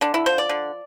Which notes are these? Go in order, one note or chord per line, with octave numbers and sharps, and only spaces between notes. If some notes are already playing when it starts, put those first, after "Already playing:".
D3 D4
E4
F3 C5
D5
D3